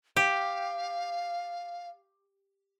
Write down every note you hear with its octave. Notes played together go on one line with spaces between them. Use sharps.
G4 F5